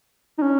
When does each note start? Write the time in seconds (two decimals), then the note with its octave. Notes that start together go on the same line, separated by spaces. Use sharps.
0.38 D#4
0.42 C#4